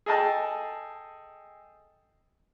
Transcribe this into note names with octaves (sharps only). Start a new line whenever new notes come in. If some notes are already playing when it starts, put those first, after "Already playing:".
G#4 A4 D#5 G5 A5